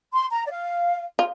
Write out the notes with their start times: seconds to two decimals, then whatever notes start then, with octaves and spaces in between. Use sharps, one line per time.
0.12 C6
0.31 A#5
0.46 D5
0.50 F5
1.19 F4